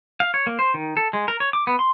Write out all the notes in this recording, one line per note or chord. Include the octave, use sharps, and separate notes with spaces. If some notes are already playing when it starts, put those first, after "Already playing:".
F5
C#5
A#3
C5
D#3
A4
G#3
A#4
C#5
D6
B3
C6